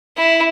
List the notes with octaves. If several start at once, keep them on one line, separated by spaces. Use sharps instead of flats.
E4